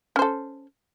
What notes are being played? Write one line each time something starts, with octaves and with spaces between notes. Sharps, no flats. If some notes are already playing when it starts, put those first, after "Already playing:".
C#4 A4 C5